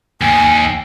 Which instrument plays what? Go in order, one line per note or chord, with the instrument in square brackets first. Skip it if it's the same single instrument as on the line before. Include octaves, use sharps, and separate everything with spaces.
[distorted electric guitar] D#2 [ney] G#5